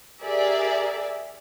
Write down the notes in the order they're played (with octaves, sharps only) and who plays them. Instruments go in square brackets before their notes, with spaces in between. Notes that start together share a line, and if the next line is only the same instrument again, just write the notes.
[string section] G4 G#4 A#4 D5 E5